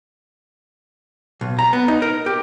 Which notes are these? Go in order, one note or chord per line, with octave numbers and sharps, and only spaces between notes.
B1
A#5
B3
D#4
A#4
G4